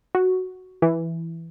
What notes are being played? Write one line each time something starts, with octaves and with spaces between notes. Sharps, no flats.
F#4
E3